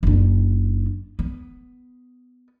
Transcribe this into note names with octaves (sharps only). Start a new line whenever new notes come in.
F#1 D4
B3